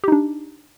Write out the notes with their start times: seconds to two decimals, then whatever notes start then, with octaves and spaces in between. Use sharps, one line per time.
0.04 G4
0.08 D#4
0.12 D4